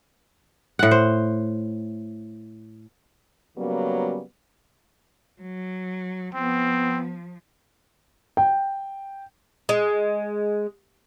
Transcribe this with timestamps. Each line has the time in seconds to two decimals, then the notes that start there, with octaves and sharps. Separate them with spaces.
0.79 A2 F#5
0.91 C5
3.57 C#3 F#3 G3 A#3 B3 C#4
5.41 F#3
6.34 F3 B3 C4
8.37 G5
9.69 G#3